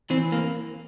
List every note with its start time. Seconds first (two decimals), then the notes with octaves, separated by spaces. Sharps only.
0.10 E3 C4
0.32 A#3